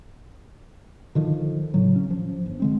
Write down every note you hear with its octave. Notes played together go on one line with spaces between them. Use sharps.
D3 D#3 F3
A2 C#3 F#3
C#4
F3
G1
D3 G#3 C4